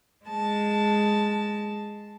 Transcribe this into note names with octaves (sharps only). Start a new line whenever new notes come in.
G#3 A5